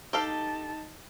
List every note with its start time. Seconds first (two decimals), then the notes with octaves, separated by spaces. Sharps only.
0.13 D#4 G4 A4 F5 A5